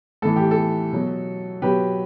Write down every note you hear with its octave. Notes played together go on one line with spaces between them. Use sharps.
A2 E3 A4
G4
A4
B2 F#3
B2 F#3 G4 B4